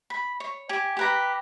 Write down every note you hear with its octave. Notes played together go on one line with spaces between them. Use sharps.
B5
C#5
G4 G#5
G4 B4 A#5